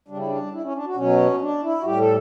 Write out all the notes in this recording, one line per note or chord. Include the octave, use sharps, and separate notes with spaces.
C#3 G3 D4
E4
D4
E4
C#4
D4
F#4
B2 F#3 C#4
D4
E4
F#4
A2 G3 G4
A4